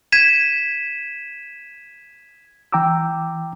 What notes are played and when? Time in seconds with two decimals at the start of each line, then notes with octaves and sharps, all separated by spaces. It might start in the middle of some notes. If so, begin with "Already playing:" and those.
0.12 G#6 B6 D#7 E7
2.72 E3 G5 A#5 D6 E6